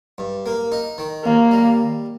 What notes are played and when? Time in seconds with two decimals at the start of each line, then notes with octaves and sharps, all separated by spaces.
0.18 G2
0.46 A#3
0.72 D#4
0.98 D#3
1.25 D#2 A#3
1.51 G3